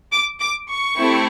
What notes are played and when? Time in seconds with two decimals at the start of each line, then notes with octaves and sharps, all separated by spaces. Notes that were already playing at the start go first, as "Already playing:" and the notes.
0.12 D6
0.40 D6
0.69 C#6
0.97 A3 C4 E4 G4